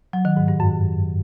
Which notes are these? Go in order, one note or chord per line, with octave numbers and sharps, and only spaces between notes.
F#3
D#3
G#2
G2
F#2